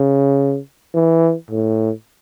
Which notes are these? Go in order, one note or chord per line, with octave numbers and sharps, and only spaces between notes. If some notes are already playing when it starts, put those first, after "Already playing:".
Already playing: C#3
E3
A2